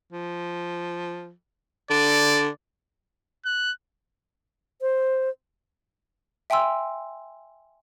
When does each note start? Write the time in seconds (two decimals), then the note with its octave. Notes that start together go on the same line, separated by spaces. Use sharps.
0.13 F3
1.90 D3 D5
3.45 F#6
4.81 C5
6.50 E5 G5 G#5 C6 E6